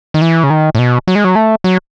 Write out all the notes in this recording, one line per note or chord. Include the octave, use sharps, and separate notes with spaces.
D#3
E3
C#3
D#3
A2
B2
F#3
G#3
F#3
A3
F#3